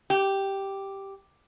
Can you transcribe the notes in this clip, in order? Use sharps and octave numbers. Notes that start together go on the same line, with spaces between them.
G4